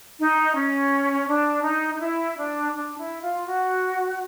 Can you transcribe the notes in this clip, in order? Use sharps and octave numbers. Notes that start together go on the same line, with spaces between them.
D#4
C#4
D4
D#4
D#4
E4
D4
D4
E4
F4
F#4